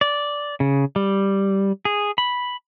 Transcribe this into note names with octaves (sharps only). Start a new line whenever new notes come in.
D5
C#3
G3
G#4
B5